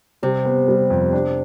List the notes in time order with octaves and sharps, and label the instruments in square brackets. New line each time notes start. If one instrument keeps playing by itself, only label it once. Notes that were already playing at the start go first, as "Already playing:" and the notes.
[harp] C3 [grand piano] G3
[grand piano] B3
G3
F2
D4